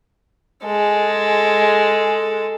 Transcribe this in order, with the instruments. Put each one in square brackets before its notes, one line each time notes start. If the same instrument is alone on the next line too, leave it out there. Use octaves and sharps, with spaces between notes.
[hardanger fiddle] G#3 A4